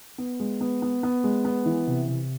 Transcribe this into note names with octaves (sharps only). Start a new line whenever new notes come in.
B3
G#3
B3
B3
B3
G#3
B3
E3
C3
C3